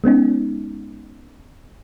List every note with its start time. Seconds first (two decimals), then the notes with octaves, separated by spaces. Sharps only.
0.04 G#3 B3 C#4 D#4